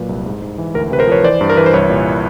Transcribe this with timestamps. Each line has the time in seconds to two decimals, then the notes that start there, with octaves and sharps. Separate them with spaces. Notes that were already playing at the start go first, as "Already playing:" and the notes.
Already playing: A#2 F#3 B4
0.09 C2
0.26 G#2
0.42 G#2
0.58 E3
0.74 D2 A#4
0.91 C3 B4
0.99 A#4 C5
1.07 F3 B4 C#5
1.23 E3 C5 D5
1.41 G2
1.50 A#4
1.57 E3 B4
1.66 C5
1.73 C2 B4 C#5
1.90 A#2